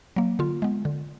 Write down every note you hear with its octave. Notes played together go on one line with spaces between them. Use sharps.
F#3 A#3
D3 F4
G#3 B3
D3